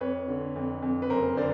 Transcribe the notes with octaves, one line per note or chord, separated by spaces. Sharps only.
F2 B4 C#5
D3
F2
F2
B4
F#1 A#4 C5
D3 C5 D5